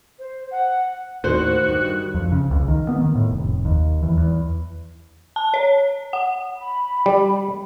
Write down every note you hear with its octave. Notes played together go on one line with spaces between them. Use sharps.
C5
F#5
D#2 A2 D#3 F#4 C5
G2 D#3
F2
C#3
C#2
D#3
B3
D#3
A2
F1
D#2
E2
E2
A5
C#5
F#5
B5
G3